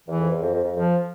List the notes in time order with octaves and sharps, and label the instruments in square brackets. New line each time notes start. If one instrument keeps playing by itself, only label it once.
[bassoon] E2 [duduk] E3
[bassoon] F2
E2
F2
F2
F2
[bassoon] F2 [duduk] F3